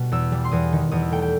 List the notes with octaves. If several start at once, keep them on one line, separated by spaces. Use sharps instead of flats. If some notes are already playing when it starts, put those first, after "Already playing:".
Already playing: B2 G3
E2 E6
G3
C6
E2 D#6
D#3
E2 D#6
E6
A3 G5
G5